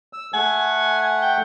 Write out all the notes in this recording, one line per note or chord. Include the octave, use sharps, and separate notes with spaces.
E6
A3 F#5 G#5
G5